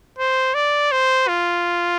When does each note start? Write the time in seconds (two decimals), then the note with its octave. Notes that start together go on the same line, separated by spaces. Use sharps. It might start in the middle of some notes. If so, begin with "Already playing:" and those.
0.18 C5
0.54 D5
0.91 C5
1.28 F4